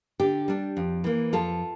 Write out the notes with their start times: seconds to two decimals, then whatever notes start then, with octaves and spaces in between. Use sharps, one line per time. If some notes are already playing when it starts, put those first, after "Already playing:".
0.20 D3 G4
0.48 G3 D4
0.77 F2
1.04 E3 A#3
1.33 F2 F4 A4